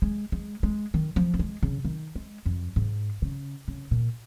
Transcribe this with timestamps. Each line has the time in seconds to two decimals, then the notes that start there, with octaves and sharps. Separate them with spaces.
0.02 G#3
0.32 G#3
0.63 G#3
0.94 D#3
1.16 F3
1.34 A#3
1.39 G#3
1.63 C#3
1.85 D#3
2.15 G#3
2.46 F2
2.76 G#2
3.22 C#3
3.68 C#3
3.91 A#2